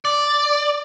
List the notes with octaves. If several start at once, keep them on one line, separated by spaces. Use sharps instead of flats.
D5